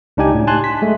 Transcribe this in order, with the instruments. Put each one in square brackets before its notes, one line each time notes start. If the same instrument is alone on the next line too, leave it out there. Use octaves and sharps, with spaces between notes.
[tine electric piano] C#2 D4 D#4 G4 G#5
A2
G#5 A5 C6 F#6
B6
G#3 A3